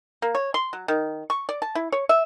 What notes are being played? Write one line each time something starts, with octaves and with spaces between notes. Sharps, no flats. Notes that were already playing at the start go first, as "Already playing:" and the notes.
A#3
C#5
C6
F#3
D#3
C#6
D5
A5
E4
C#5
E5